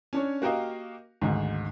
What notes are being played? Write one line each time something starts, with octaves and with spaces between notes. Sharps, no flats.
C#4 D4 C#5
A#3 F#4 G4 A#4 D#5 F5
G#1 D2 G#2